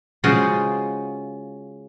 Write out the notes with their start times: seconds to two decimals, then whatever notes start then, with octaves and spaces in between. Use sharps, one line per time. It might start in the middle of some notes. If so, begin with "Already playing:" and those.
0.24 C#3 G#3 F4 F#4 G#4 C5